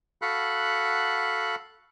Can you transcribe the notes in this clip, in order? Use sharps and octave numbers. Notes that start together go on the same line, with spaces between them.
F#4 A4 F5 F#5 B5 F#6